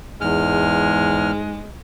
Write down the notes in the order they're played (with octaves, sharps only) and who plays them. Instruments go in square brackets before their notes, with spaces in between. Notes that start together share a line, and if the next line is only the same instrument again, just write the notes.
[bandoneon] E2 F6 [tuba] G#2 [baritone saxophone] G#3